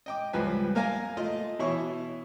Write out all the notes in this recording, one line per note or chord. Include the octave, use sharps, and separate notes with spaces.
D#5 G5 D6
C#2 G2 F3 B4 G#5
A#3 A#4 F5 G#5 A#5
A3 F4 D#5
B2 E3 E4 C#5 C#6